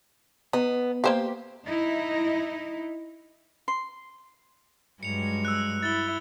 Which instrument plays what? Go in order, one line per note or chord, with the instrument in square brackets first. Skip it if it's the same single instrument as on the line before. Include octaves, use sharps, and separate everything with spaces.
[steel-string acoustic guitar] B3 [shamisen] D#4
[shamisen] A#3 C5 F5 [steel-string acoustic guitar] G4
[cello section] D#4 E4
[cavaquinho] C6
[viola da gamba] G2 F#3 G#3 [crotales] C#7 F7
[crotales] E6 F#6
[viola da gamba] E4 [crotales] A6 G7